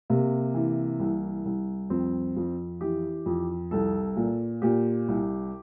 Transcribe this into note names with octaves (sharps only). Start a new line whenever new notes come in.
C3 A#3
E3
C2
C2
F2 C4
F2
E3 G4
F2
C2 A4
A#2
A#2 G4
C2